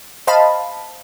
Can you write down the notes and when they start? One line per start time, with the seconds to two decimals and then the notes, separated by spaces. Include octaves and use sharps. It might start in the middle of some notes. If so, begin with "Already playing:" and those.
0.27 C5 D#5 F5 A5 B5